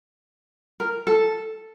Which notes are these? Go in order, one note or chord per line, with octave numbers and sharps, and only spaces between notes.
A#4
A4